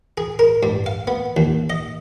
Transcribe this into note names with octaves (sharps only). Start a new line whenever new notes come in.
G#4
A#4
G2
F5
B3
D#2
D#5